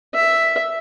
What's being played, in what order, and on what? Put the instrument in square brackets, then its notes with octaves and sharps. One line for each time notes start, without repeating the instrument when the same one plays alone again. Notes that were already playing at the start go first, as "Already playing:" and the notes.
[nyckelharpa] E5